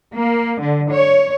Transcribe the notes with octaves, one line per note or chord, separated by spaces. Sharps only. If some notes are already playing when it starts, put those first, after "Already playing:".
A#3
D3
C#5